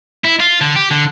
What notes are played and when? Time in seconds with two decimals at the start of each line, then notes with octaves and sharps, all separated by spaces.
0.25 E4
0.40 F4
0.61 D3
0.76 G4
0.91 D3